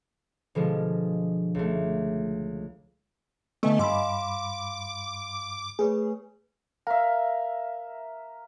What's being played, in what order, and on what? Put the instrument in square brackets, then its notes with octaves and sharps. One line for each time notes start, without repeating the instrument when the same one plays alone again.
[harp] B2 D3 F3 G#3
C#2 A3
[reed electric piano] D3 B3 [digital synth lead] A3 [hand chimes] D#5 G#5
[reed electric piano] G2 B5 [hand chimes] F5 C6 E6 [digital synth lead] D6
[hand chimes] A3 B4 C#5 [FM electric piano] G#4
[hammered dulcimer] A#4 E5 [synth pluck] F5